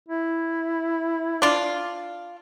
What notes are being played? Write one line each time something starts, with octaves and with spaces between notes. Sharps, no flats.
E4
D4 F4